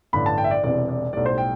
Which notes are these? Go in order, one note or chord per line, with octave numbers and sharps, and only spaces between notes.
A1 G2 D3 B5
A5
G5
E5
D5
E1 E2 C3 D5
D5
B1 A2 G3 D5
C5
G5